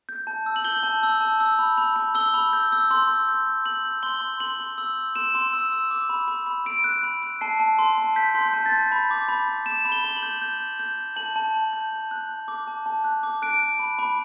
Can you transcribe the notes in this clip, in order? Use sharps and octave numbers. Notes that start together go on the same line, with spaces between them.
G6
A5
E6
F#7
G6 G7
A5
E6
A5
E6
B5
B5
B5
E6 G7
B5
G6
E6
C6
G6
G6
C6
C6 F#7
G6
C6 G7
C6
C6 F#7
C6
E6
G6
C6 E7
C6
E6
E6
D6
B5
B5
B5
B5 D7
F#6
B5
F#6
A5 C7
A5
C6
A5
G6 B6
C6
G6
A5
A6
A5
B5
D6
B5
D6
D6 E7
B5
G7
B5
F#7
G6
G6
G6
G6
G6
A5 F#7
A5
A5
G6
A5
F#6
A5
D6
A5
A5
F#6
D6
F#6 D7
F#6
B5
B5